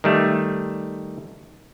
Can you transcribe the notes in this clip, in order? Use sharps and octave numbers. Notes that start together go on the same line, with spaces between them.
D#3 G3 A3